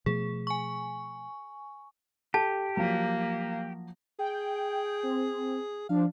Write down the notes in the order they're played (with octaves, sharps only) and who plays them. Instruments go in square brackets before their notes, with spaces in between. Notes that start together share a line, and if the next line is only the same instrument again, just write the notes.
[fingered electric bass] B2 F3 A3 [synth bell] G#4
[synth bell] G#5 C#6
[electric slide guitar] G4 [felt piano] A4 [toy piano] A5
[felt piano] F3 F#3 [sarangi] A#3
[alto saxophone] G#4 [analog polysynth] G5
[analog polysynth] C4
[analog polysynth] F3 D4 [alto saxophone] F5